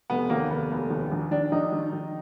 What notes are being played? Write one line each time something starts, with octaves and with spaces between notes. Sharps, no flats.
F1 B3
D#2 A#3
F1 B3
F1
D#2
A#1
D#3 D4
A#1 D#4
D#3
A#1